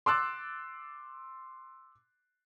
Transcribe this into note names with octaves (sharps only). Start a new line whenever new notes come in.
C6 D6 E6 F#6 A6